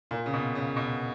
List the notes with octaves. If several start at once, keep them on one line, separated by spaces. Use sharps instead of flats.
A#2
C#3
B2
C#3
B2